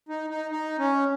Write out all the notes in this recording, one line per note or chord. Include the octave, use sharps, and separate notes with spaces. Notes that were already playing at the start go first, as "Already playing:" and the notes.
D#4
D#4
D#4
C#4